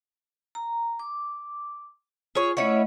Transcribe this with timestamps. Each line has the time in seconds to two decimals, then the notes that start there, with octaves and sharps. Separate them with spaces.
0.55 A#5
0.99 D6
2.35 F4 G#4 C#5
2.57 A3 C#4 E4 C#5 D#5 F#5